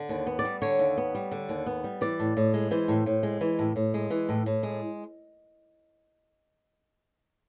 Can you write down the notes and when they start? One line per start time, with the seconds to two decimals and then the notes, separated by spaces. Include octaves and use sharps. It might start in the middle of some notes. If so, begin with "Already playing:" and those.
Already playing: D3
0.09 D#2
0.26 B3
0.39 D5
0.45 G3
0.62 D3 C#5
0.79 D#2
0.97 B3
1.15 G3
1.31 D3
1.49 D#2
1.66 B3
1.84 G3
2.01 E3 D5
2.19 A2
2.37 A2
2.54 G#3
2.71 E3 C5
2.88 A2
3.06 A2
3.23 G#3
3.41 E3
3.59 A2
3.76 A2
3.94 G#3
4.10 E3
4.29 A2
4.46 A2
4.63 G#3